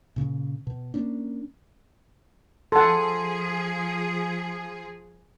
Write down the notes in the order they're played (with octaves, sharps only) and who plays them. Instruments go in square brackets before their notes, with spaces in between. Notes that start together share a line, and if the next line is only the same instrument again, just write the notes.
[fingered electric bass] A#2 C#3
B2
A#3 C#4 D4
[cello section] F3 G#4 [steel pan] A4 F#5 [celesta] C6